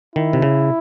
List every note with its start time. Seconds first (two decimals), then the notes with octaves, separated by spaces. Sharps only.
0.16 D#3 E4
0.33 C3
0.42 C#3